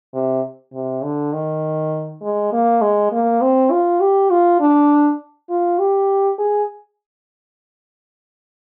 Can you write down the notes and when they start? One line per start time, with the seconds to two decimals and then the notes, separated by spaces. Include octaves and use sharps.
0.14 C3
0.73 C3
1.04 D3
1.33 D#3
2.22 G#3
2.53 A#3
2.82 G#3
3.12 A#3
3.42 C4
3.71 F4
4.00 G4
4.30 F4
4.60 D4
5.50 F4
5.79 G4
6.39 G#4